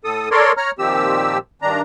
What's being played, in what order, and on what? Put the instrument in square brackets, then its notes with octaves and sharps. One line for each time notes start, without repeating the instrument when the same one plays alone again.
[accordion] A2 A4 D#6
A4 A#4 C#5 D5 C6
C#5 A#5 F6
A#2 D#3 F3 C4 G4 E6
G2 D#3 D4 A#5